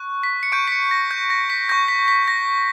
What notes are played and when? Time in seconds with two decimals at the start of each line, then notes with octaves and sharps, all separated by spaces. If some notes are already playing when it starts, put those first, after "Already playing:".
Already playing: C#6 F#6
0.23 B6
0.43 C#7
0.52 C#6 G6 D7
0.67 B6
0.72 C#7
0.91 A#6
1.11 G6
1.30 A#6
1.50 B6
1.69 C#6 G6 A#6
1.88 B6
2.08 B6
2.28 A#6